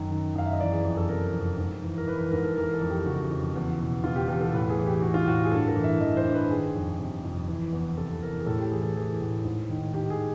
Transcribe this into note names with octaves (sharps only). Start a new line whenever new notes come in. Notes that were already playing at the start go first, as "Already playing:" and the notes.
Already playing: F#2 D#3
D#3
F#2 F5
E5
D#5
E3 D5
G#4
F2 G#4
A4
C3 A#4
F2
G#2
E3
A#4
E3 B4
B4
G#2 A#4
A4
E3 A#4
A4
F2
G4
C#3 F#4
F2
E2
B2
B2 F4
G4
E2 G4
A4
A2 B4
G#4
E3
G4
E3 F#4
F4
A2 F#4
G#4
G2 A4
A#4
E3
E5
E3 D#5
C5
G2
B4
D#3 G#4
F2
C3
F2
E3
E2
C3 A4
E2 A#4
G#4
A2 A4
G4
E3 G#4
A4
E3 G#4
A2
G#2
D#3
D#3 G4
G#4